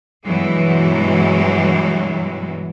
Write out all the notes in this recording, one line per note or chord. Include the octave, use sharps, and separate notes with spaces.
G2 B2 E3 F#3 G#3